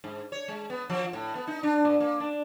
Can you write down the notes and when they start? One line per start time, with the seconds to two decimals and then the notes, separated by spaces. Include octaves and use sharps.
0.04 G#2
0.32 C#5
0.48 G#3
0.70 B3
0.90 F3
1.13 A2
1.35 B3
1.47 D#4
1.63 D4
1.85 A#2
2.00 A#3
2.20 D4